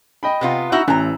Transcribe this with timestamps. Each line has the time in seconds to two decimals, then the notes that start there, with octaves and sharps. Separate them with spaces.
0.23 D#5 G5 B5
0.41 C3 B3 F4
0.72 D#4 E4 F#4 F#5 E6 F#7
0.88 A1 E3 A#5